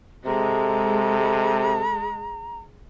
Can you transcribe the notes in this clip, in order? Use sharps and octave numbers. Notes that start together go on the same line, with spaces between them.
C3 G#3 A4 A#5